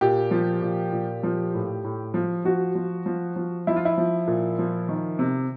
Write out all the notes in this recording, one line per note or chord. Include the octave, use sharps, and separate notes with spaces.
A#2 G4
F3
A#2
A#2
F3
A2
A2
F3
F3 F#4
F3
F3
F3
F3 E4
F4
E4
F3
A#2
F3
D#3
C3